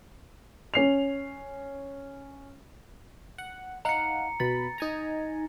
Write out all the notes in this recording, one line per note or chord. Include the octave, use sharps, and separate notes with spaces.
C#4 C7 F7
F#5
D#4 F5 F#5 A#5 C#7
B2 B5 A6
D#4 G#5 A#5